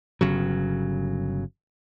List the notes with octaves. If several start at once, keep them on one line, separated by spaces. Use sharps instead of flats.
G1 C#3 F#3